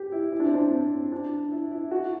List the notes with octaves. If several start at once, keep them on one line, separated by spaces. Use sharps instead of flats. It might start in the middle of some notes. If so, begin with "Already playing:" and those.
Already playing: G4
E4
E4
D4
C4
D4
C4
D4
E4
E4
F#4